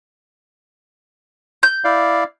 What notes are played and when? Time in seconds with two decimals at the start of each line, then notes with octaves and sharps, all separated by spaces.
1.63 G6
1.84 E4 D5 F5